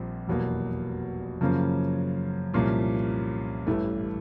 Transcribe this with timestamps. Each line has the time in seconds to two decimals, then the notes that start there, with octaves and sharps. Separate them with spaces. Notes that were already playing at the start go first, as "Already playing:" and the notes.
Already playing: A#1 A#2 G3 C4
0.27 F1 E2 B2 F#3 A#3
1.41 F#2 C#3 F3 A#3 C#4
2.54 C2 A#2 F3 A#3 C#4
3.67 A1 G2 E3 A3